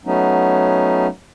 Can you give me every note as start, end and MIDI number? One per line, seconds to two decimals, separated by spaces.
0.06 1.07 54
0.06 1.07 57
0.06 1.07 59
0.06 1.07 61
0.06 1.07 63